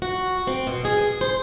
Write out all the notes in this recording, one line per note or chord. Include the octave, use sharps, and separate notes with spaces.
F#4
C4
B2
G#4
C5